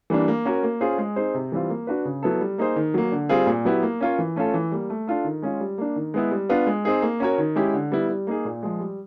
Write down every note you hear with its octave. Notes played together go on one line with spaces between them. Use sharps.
E3 G3 A#3 D4
A#3
C#4 F#4 A#4
A#3
C#4 F4 G#4 C5
G#3
C4 D#4 G#4 C5
C3
E3 G3 C4 F4
A#3
D4 F#4 B4
C#3
F#3 B3 E4 A4
G3
A#3 D#4 G#4 C5
D#3
F#3 A#3
D3
G3 C4 F4 G#4
A#2
F#3 B3 E4 G4
A#3
C#4 F4 A#4 C#5
E3
A3 C#4 F4 A4
E3
G3 A#3
A3
D4 F4 A4
D#3
G#3 C#4 F4
G3
A#3 D4
D#3
G#3 B3 E4
G3
B3 D4 F4
G#3
C4 D#4 G#4
A#3
C#4 F#4 A#4 C#5
D#3
G#3 C#4 E4 G4
D3
G3 B3 E4
G3
A#3 D#4 G#4
A#2
F3 G#3
G3